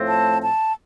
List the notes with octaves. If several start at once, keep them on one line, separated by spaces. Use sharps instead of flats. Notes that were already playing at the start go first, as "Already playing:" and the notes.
Already playing: A2 F3 A3 C4
A5
A5